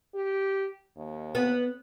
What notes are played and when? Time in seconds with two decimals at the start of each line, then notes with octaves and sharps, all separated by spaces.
0.15 G4
0.96 D#2
1.35 B3